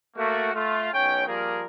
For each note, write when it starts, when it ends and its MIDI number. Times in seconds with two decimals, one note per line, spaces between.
0.16 0.53 57
0.16 0.53 58
0.16 0.53 66
0.54 0.89 57
0.54 0.89 65
0.93 1.25 35
0.93 1.25 61
0.93 1.25 73
0.93 1.25 79
1.27 1.64 53
1.27 1.64 55
1.27 1.64 58
1.27 1.64 68
1.27 1.64 70